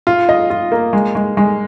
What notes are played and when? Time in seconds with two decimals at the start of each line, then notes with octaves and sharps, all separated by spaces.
0.07 F4
0.29 D#5
0.50 F4
0.72 A#3
0.93 G#3
1.15 G#3
1.37 G#3